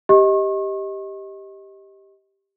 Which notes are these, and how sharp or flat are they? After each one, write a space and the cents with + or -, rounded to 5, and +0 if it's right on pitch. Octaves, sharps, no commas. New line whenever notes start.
G4 +0 D#5 +15 C#6 -40